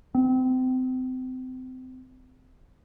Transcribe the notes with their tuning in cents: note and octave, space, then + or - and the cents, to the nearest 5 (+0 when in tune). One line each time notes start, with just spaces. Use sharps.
C4 -30